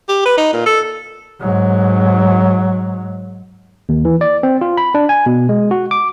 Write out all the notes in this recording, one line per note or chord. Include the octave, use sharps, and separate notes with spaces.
G4
B4
D#4
A#2
A4
G#2 F#3
D#2
E3
D5
C4
F4
B5
D4
G#5
B2
G#3
F#4
D6